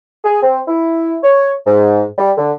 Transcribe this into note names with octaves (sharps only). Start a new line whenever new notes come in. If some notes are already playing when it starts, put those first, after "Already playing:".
G#4
C4
E4
C#5
G#2
G3
D3